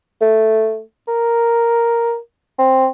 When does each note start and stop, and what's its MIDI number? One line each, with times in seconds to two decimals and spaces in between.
0.21 0.80 57
1.08 2.17 70
2.59 2.88 60